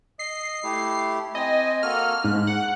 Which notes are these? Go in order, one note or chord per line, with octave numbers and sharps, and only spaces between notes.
D#5 C7
A3 E4 G4
C4 D#5 G#5
A#3 F#4 A4 F6
G#2 F#6
F#5